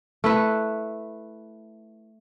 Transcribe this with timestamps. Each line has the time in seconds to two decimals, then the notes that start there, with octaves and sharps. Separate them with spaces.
0.24 A3 E4 B4